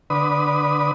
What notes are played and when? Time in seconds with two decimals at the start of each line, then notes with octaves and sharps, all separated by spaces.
0.10 D3 B4 D#6